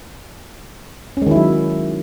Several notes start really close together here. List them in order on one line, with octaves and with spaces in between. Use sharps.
C#4 G#3 D#3 E4 F#3